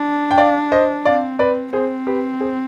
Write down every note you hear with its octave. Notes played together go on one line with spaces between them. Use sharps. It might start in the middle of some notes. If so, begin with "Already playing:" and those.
Already playing: D4
G5
D5 F5
C5 D#5
C4 D5 F5
B4 D5
C4 G#4 C5
G4 B4
G#4 C5